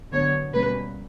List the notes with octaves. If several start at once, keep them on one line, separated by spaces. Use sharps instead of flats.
D3 F#3 B3 C#5
B2 G3 A#3 C#4 B4